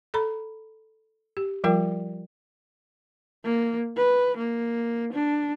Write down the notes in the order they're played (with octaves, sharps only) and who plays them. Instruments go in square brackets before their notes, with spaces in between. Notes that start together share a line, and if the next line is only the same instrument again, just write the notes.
[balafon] A4 A#5 B5
G4
F3 G3 F4 A#4 D5 G5
[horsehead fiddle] A#3
B4
A#3
D4